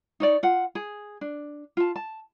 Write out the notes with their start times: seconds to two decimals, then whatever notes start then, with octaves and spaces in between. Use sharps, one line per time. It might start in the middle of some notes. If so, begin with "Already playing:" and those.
0.20 D#4 C#5 D5
0.43 F4 F#5
0.75 G#4
1.21 D4
1.77 F4 A5
1.96 A5